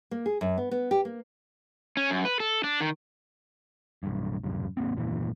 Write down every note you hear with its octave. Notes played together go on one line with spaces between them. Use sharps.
A#3
G#4
F#2
B3
B3
G4
A#3
C#4
F#2
B4
A4
D4
D#3
B1 G2
D1 C2 F#2
G#1 F#2 A#3 C4
D#1 F#2 A#2 E3